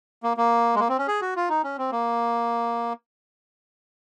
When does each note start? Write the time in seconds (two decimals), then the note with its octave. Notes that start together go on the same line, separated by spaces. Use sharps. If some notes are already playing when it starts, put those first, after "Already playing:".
0.23 A#3
0.37 A#3
0.75 G#3
0.80 A#3
0.89 C4
0.98 C#4
1.08 G#4
1.21 F#4
1.36 F4
1.49 D#4
1.64 C#4
1.78 C4
1.92 A#3